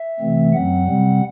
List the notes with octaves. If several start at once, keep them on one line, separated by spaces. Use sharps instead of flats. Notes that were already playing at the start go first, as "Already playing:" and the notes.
Already playing: E5
C3 E3 A3 C4
F#2 F#3 C4 F#5
C3 G3 C4